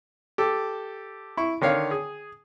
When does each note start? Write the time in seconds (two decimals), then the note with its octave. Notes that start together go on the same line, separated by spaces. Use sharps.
0.38 G4 A4
1.37 E4 C#6
1.61 D3 D#3 C#5 F5
1.91 G#4